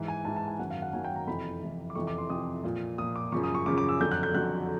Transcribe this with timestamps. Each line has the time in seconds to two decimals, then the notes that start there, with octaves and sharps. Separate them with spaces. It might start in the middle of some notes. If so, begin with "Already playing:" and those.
Already playing: G#2 E3
0.08 G#5
0.25 G#2 E3 A5
0.36 A5
0.48 G#5
0.59 F#2 D#3 F#3 F#5
0.70 F5
0.82 F#5
0.93 F#2 D#3 F#3 G#5
1.04 G5
1.16 A#5
1.27 F2 C3 E3 B5
1.61 F2 C3 E3
1.90 D6
1.95 F2 C3 E3 C#6
2.07 D6
2.18 C6
2.30 F2 C3 E3 D#6
2.64 A#2 F3
2.98 A#2 D#6
3.01 F3
3.16 D6
3.32 F#2 C#3 F3 C#6
3.44 D#6
3.55 C#6
3.66 F#2 C#3 F3 D6
3.78 D6
3.89 E6
4.00 F2 D3 F#3 G6
4.11 F#6
4.23 G6
4.34 F2 D3 F#3 F#6